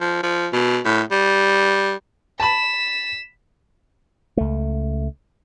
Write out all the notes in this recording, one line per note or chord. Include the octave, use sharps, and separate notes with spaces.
F3
F3
B2
A2
G3
A5 B5 B6 E7
C#2 A3